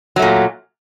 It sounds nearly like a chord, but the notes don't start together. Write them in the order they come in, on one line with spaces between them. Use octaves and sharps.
F#3 A3 A#2